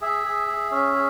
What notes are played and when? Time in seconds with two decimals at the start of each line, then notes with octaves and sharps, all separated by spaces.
0.01 G#4 E5
0.24 G#4
0.48 G#4
0.71 C#4 E5
0.94 G#4